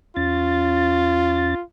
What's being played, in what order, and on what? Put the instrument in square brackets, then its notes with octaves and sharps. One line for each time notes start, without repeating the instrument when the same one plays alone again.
[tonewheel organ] E2 C#4 A6 [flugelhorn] F4